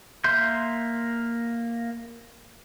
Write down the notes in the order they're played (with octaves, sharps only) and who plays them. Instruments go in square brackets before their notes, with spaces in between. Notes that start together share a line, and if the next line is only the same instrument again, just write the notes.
[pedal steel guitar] A#3 E5 C6 G6